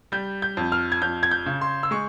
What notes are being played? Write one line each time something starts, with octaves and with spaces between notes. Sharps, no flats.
G3 G6
G6
F2
F6
G#6
F2 G6
G#6
G6
C#3
C6
E6
G#3 C#6